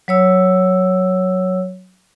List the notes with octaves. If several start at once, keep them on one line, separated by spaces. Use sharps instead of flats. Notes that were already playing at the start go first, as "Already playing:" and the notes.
F#3 C#5 E6